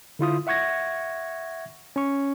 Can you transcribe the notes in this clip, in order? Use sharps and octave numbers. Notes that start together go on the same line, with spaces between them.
D3 E4 F4 D#6
E5 F#5 C#6 G#6 A#6
C#4 C#6